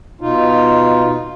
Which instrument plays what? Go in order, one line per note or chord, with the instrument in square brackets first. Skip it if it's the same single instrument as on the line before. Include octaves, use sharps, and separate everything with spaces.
[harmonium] B2 D#4 F4